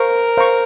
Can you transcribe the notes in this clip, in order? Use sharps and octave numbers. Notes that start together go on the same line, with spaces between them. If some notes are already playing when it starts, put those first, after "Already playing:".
Already playing: A#4 C5 F5 C#6
C5 F5 A#5 C#6